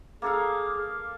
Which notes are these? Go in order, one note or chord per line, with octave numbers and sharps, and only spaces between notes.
A#3 G#4 A4 F5